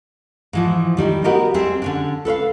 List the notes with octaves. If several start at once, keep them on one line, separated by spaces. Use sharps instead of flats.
G#2 E3 F3
D#3 G3 D#4 E4
B3 F#4 G4 A#4 D#5 E5
G3 C4 G#4 E5
D3 C#4 D4
A4 B4 C#5 F5